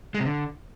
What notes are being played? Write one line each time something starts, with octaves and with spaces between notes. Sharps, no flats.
G#3
C3
D3